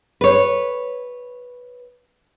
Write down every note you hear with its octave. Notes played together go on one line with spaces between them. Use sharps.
B4 C#5